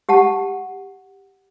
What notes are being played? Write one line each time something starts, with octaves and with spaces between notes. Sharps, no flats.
G4 F#5 A5